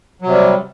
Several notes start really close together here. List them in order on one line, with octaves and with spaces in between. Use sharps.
F#3 C3 G3